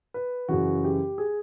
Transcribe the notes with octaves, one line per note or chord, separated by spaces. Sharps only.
B4
F#2 C#3 E3 F#4
G4
G#4